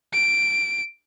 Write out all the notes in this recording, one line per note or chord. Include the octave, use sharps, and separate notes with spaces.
D7